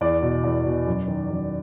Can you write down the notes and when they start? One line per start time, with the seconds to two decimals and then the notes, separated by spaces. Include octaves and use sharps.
0.01 E2 D5
0.22 B2
0.44 E2
0.66 B2
0.87 F#2
1.08 D#3
1.30 F#2